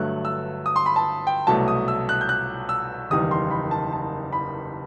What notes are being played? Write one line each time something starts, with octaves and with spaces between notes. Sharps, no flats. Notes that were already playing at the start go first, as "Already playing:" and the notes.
Already playing: G1 G2 F#3 A3 F#6
E6
D#6
C6
B5
A5
G5
C2 B2 F#3 A3 A5
D#6
E6
F#6
G6
F#6
E6
F#1 E2 D#3 G3 D#6
C6
B5
A5
A5
B5